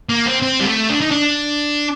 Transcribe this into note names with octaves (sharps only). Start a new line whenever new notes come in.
A#3
C4
C4
G3
A3
D4
D#4
D4